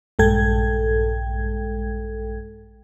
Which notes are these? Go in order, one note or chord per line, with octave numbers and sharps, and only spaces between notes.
A#1 G2 G#3 A4 G5 G#6